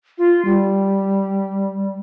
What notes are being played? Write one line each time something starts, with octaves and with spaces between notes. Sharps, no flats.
F4
G3